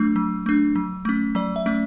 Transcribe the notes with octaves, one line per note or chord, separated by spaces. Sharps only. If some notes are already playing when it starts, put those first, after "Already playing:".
Already playing: F#3 A3 D4
F#3
A3 D4
F#3
A3 C#4
F#3 D5
E5
A3 C#4